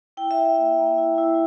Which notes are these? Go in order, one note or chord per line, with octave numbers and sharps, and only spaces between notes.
E4 G5
E5
E4
G5
A#3
A#3
E4
E4